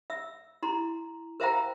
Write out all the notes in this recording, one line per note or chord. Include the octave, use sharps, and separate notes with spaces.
E5 E6
E4 A#5 C6
A#4 C5 E5 F5 G5 A#5